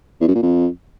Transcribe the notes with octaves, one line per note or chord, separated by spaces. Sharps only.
E2
F#2
A#2
F2